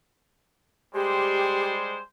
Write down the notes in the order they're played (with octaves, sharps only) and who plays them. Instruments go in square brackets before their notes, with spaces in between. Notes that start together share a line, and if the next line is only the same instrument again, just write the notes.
[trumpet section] G3 G#3 C5 [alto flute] G4